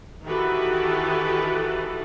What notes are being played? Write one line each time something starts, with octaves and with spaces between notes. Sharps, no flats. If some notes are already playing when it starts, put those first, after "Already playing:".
D#3 E3 F#4 G4 A4 B4